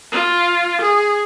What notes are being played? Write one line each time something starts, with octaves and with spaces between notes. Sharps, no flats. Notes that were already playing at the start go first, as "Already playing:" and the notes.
F4
G#4